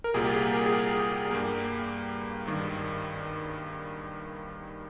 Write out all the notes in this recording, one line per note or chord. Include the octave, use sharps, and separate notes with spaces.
A#4
C2 A#2 G3 A#3 G#4
G4
G#4
A#4
G#4
G4
G2 G3 A#3
G#1 G2 D#3